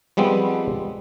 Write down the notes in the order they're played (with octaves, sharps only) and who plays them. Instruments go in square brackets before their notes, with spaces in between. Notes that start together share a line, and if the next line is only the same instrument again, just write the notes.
[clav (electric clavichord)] F3 G3 G#3 B3 C4